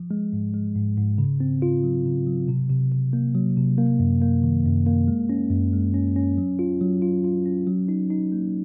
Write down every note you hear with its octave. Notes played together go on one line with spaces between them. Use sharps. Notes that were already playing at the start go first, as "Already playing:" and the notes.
Already playing: F3
G#3
G#2
G#3
G#2
G#2
C#3
C4
F4
F#3
C#3
F#3
C3
C3
C3
A#3
F#3
C3
A#3
F#2
A#3
D#3
F#2
A#3
G#3
C#4
F#2
G#3
C#4
C#4
F#3
F4
F#3
F4
F4
C#4
F#3
D#4
D#4
A#3